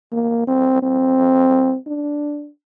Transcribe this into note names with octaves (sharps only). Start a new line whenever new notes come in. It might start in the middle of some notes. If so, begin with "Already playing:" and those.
A#3
C4
C4
D4